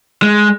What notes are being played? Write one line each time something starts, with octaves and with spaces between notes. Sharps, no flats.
G#3